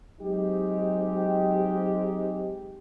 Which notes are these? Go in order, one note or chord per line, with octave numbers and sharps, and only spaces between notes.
F#3 G#3 C4 D#4 G4